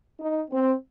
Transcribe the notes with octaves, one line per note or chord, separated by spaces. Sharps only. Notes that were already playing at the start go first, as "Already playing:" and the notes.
D#4
C4